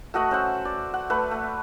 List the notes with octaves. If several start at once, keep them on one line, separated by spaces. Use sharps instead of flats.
A3 F#4 D#5 F#5
C#4 C5 E5 F#5
D5
F#5
A3 B4
A3